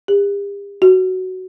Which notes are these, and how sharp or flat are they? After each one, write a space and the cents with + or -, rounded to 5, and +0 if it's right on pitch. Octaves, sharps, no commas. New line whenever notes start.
G4 +45
F#4 +10